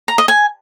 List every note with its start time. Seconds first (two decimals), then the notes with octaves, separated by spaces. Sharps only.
0.08 A#5
0.18 D#5
0.28 G#5